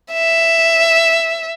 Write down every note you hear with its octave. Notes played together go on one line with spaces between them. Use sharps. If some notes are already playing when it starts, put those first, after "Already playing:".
E5